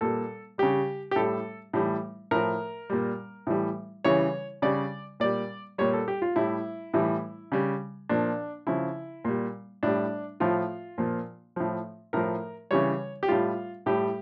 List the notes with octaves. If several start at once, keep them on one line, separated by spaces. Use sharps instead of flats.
A#2 G3 A4
C#3 G3 G4
G4
A2 G3 A4
A2 E3 G3
A2 F3 A#4
A#2 G3
A2 E3 G3
C#3 E3 G3 C#5
C#3 G3 D5
A#2 G3 D5
A#2 G3 C#5
A4
G4
F4
A2 G3 E4
A2 E3 G3
C#3 G3
A#2 F3 D4
C#3 F3 E4
A#2 G3
A2 G3 D4
A2 F3 F4
A#2 F3
A2 F3
A2 F3 A#4
C#3 E3 G3 C#5
G4
A2 G3 F4
A2 G3 G4